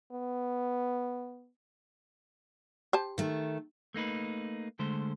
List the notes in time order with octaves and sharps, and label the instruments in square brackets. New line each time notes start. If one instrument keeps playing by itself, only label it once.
[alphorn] B3
[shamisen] G4 C5 A5
[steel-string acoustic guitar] D#3 A3
[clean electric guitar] A3 A#3 D#4 B4
D3 G#3 A3 C5